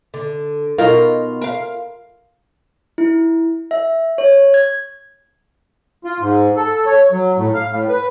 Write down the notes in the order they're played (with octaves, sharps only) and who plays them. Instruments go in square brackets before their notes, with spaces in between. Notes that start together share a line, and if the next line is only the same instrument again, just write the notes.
[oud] D3
[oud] B2 D#4 A#4 [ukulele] F4
[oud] A#4 F5
[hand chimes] E4
E5
C#5
G#6
[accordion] F4
G#2
A4
C#5
F#3
A2
F5
A2
B4